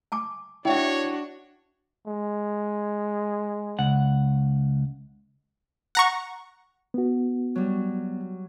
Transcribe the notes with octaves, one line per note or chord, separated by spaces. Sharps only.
G#5 A5 D6
D4 E4 F#4 C#5 E5 G5
G#3
C#2 F#5
F#5 A#5 C#6
B3 F#4
F#3 G3